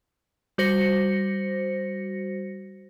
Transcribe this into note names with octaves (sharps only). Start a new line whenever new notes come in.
G3 F#4 C5 A#6 C#7